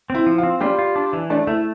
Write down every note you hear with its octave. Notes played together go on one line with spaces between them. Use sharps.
C4 E4
F3
F4
C4
G3 F4 G4
F4
D4
E3
A3 D4 D5
A3 E4 E5